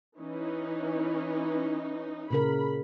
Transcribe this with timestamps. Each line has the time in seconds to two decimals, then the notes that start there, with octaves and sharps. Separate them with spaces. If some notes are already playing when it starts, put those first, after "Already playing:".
0.18 E3 C#4 D#4
2.31 A#2 C#3 A#4 B5